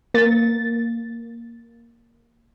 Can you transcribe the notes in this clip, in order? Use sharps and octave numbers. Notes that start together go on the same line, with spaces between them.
A#3 A6